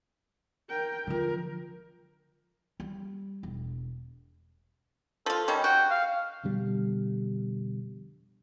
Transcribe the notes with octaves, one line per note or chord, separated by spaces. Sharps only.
A#4 G5
D3 F3 A#4
G3
E1
F3 F4 A4
D#3 G3 C#4
F#4 G5
F5
F2 B2 D3 G3